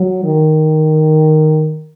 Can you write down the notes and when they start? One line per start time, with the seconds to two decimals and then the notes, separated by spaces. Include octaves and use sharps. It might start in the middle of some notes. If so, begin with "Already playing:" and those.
Already playing: F#3
0.24 D#3